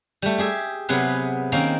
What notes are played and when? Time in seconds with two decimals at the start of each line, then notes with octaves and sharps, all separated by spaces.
0.22 G3 A3
0.38 G4 G#4 E5
0.89 C3 F#3 B3 G#4 B4
1.52 D#3 A#3 C4 C#4 A#5